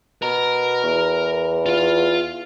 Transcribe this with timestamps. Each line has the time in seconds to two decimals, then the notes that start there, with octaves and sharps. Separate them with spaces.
0.22 B2 A#4 A#5
0.84 E2
1.66 F4 F5